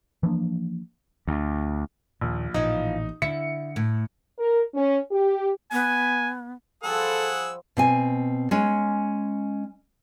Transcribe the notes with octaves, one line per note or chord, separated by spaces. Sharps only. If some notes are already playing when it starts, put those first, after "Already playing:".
E3 F3 A#3 D4
D2
A#1 D#2 A#2
A1 A#2 E3 F3 D#4
D3 E4 C#7
A2
A#4
C#4
G4
B3 G#5
F3 G3 G#4 A4 F#5 E6
B2 C4 G#5
G#3 C#4